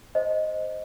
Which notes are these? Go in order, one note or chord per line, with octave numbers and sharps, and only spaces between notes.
C5 D#5